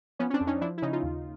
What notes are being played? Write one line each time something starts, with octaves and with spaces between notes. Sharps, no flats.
F3 B3 C#4
C#4
C4 D4
F2
C#4 D#4
F3 D4 E4
E4
C#3 C#4 D#4
D#4 F4
D#2